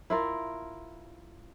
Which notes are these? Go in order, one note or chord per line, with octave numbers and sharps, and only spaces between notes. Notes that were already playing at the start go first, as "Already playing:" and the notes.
E4 F4 A#4